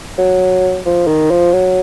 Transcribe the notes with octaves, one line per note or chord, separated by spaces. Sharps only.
F#3
F3
D#3
F3
F#3